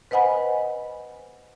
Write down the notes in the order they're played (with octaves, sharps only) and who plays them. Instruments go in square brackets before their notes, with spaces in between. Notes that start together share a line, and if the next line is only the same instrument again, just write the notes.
[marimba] B4 C5 D#5 F#5 G#5 B5